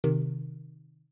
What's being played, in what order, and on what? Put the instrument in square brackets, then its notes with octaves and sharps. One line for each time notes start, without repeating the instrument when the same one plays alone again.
[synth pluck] C3 D#3